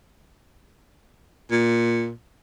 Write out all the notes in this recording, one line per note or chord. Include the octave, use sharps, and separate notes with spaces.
A#2